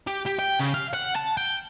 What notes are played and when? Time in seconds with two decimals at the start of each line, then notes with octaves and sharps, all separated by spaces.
0.07 G4
0.26 G4
0.39 G5
0.60 C#3
0.74 F5
0.93 F#5
1.15 A5
1.37 G5